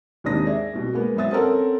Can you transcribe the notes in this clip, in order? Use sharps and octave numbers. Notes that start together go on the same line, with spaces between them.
D#2 G#2 C3 D4 D#6 A#6
G#4 D5 E5
C2 B2
G#3 A#3 B3
F#2 B3 C5 E5 D#6 A6
C4 C#4 A4 A#4 F#5